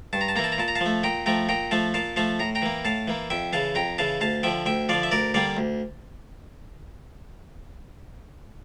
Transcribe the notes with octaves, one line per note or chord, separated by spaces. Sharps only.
G2 A5
A#5
A5
E3 A#3 A#5
A5
A#5
A#2 A5
A#5
F5 A5
F3
A3
A#2 G5 A#5
F3 A3 G5 A#5
A#2 G5 A#5
F3 A3 F5 A5
A#2 F5 A5
F3 A3 F5 A5
A2 A#5
G5 A#5
E3 A#3
A2 F5 A5
E3 A#3
F2 E5 G5
C#3 E3 F5 A5
F2 G5 A#5
C#3 E3 F5 A5
D2 F5 A5
D3 F3 E5 G5
D2 E5 G5
D3 F3 D5 F5
E5
D2 A#4 D5
D3 G3 A#3 D5 F5
D2